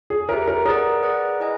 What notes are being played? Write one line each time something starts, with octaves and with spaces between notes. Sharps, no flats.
G#4
G4 A#4 B4 E5
A#4
G#4 A#4 B4 D5 F#5
G#4 B4 D5 F#5
E4 G#4 B4 D#5 G#5